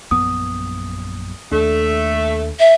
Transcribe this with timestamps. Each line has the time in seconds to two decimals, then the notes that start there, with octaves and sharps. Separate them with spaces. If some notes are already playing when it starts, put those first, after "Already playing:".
0.11 A#1 F#2 B3 D#6
1.52 D#2 A3 D4
2.59 E5